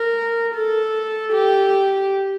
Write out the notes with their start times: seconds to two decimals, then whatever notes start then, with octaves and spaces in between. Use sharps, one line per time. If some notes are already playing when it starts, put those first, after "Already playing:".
Already playing: A#4
0.55 A4
1.33 G4